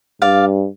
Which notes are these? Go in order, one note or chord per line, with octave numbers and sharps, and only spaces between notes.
G2 D5 F5